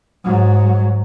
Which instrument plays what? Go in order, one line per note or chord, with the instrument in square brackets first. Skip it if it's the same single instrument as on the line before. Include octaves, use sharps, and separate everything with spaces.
[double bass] G#2 F#3